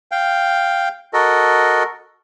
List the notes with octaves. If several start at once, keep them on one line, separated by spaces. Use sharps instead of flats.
F5 G5
F#4 A4 A#4 D#5